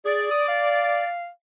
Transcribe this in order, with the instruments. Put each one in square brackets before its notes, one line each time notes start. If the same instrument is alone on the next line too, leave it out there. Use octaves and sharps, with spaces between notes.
[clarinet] G#4 [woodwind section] D5
[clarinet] D#6
F5